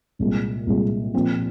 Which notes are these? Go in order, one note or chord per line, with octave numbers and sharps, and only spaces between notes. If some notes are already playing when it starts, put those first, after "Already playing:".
C2 A#2 G#3
C2 A#2 G#3
A#2 F3 C4